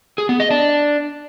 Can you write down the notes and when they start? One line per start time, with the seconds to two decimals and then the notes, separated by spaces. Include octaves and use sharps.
0.18 G#4
0.29 B3
0.40 D#5
0.51 D4